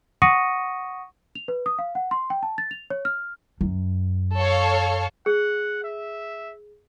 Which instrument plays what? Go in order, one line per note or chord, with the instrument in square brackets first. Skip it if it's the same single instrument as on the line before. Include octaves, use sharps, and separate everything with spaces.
[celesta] F#5 C#6 D#6 A#6 C#7 D#7
F7
B4
D#6
F5
F#5
C6
G5
A5
A6
F7
C#5
F6
[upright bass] F#2
[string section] A4 C#5 F5
[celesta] G#4 [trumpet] F#5
[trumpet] E5